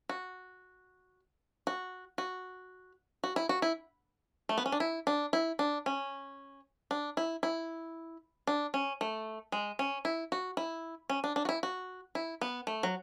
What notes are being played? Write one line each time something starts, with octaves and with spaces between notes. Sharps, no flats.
F#4
F#4
F#4
F#4
E4
F#4
E4
A3
B3
C#4
D4
E4
D4
E4
D4
C#4
D4
E4
E4
D4
C#4
A3
G#3
C#4
E4
F#4
E4
C#4
D4
D4
F#4
E4
F#4
E4
B3
A3
F#3